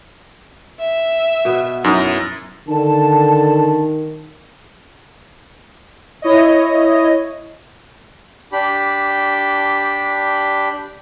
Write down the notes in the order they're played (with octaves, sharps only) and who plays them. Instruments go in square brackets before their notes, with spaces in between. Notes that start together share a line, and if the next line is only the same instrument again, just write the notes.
[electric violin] E5
[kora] B2 B3
[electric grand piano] F#2 [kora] D#4 [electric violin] E4 D#6
[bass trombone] D3 [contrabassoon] D#3 [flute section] A5
[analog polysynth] E4 C#5 D#5
[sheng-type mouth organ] D4 G4 B5